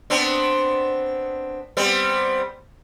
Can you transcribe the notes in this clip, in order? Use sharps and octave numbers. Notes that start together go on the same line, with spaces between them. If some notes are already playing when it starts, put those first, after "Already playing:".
B3 C4 D4
G3 B3 C4